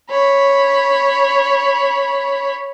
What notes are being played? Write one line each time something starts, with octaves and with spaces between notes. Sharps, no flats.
C#5 B5